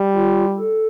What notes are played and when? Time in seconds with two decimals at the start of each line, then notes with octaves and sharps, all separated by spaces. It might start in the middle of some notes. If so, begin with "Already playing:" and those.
Already playing: G3
0.14 F4
0.58 A4